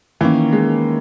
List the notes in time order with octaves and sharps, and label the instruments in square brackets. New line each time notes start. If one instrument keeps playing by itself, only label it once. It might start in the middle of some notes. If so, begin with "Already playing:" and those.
[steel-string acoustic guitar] D#3 A#3 C#4 [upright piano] E3
[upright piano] G#3